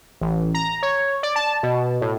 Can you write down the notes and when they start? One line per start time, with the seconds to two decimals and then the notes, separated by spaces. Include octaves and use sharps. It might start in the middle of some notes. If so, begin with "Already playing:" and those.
0.21 A1
0.55 A#5
0.83 C#5
1.23 D5
1.36 A5
1.63 B2
2.01 A2